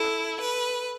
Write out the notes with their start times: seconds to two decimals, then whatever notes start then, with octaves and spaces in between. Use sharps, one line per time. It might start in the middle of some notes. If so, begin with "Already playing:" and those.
Already playing: E4 A4
0.41 B4